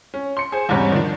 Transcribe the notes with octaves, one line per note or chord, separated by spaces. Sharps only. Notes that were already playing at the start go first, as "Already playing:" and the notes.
C#4
C6 C#7
G#4 C5
E2 G#2 C3 G3 C#4
D#3 F3 D4